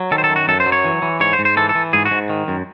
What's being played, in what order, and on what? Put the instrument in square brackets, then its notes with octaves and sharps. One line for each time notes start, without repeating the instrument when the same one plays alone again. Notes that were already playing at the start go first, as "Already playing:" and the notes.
Already playing: [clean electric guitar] F#3
D#3 A4
C5
A4
F#2
F#4
F#2 A4
C5
F#3
C#5
E3
E3
G#2 C#5
C5
G#2
C5
E3 A4
A4
E3
G#2 G#4
F#4
G#2
D#3
F#2